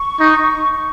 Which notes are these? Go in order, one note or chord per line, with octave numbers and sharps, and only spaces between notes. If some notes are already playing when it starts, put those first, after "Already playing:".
Already playing: C#6
D#4
C#6